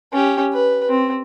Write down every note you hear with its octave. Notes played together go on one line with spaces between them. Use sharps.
C#4 G4
B4
C4